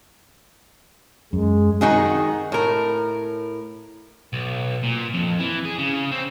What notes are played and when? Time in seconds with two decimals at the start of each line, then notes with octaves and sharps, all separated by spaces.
1.33 F#2 G#3
1.81 D#3 D#4 F#4 G#4
2.52 A2 A#4
4.33 B1
4.83 A#2
5.14 F2
5.39 E3
5.65 G#4
5.78 C#3
6.11 C4